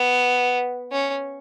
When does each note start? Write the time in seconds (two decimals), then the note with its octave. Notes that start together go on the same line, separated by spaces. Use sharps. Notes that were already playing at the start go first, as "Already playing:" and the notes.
Already playing: B3
0.92 C#4